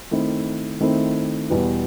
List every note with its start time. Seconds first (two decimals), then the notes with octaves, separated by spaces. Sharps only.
0.11 D#3 A3 C4 E4
0.81 D#3 A3 C4 E4
1.50 E2 B2 G3 B3